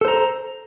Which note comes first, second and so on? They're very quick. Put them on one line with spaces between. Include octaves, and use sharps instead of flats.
A4 C5 A#5